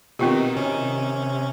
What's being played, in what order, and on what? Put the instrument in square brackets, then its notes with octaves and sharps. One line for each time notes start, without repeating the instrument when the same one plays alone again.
[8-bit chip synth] B2 [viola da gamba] D#3 [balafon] C4 F4 G4
[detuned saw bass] C3 [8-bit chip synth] C#4